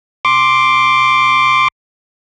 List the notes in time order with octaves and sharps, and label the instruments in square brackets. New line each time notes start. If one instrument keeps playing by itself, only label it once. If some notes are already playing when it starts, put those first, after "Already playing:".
[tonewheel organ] C6 D6